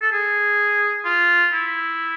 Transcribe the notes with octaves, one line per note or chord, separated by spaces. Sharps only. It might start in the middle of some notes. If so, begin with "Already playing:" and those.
A4
G#4
F4
E4